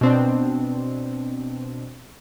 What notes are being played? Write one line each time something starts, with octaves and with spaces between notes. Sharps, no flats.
B2 C4 D4